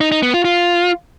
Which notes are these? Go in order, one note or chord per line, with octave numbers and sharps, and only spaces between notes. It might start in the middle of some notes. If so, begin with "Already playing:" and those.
D#4
D#4
B3
F4
F4